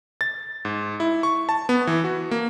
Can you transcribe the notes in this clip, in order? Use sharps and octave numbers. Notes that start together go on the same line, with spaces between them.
A6
G#2
E4
C#6
A5
B3
E3
F#4
A#3